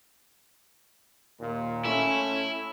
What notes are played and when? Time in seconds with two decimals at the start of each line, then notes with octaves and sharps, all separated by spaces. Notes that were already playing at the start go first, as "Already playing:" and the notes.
1.40 D#2 A#2
1.86 A3 C#4 E4